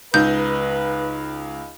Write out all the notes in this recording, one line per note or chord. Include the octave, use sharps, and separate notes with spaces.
C#2 D#4 B4 G6